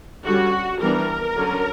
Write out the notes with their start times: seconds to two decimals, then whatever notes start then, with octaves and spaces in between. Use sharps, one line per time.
0.26 D3 G3 C#4 F#4
0.81 E3 G3 B3 D4 A#4
1.35 D3 F#3 C#4